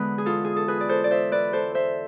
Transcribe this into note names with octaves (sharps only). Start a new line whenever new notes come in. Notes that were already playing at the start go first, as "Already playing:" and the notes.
Already playing: E2 D3 G#3 B3 B4
G#4
F4 A4
G#4
A4
G#4 B4
D5
A4 C5
D5
C5 E5
B4 D5
A4 C5
C5 E5